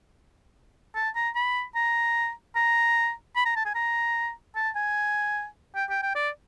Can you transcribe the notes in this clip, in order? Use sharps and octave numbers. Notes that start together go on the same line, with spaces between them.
A5
A#5
B5
A#5
A#5
B5
A#5
A5
G#5
A#5
A5
G#5
G5
G5
G5
D5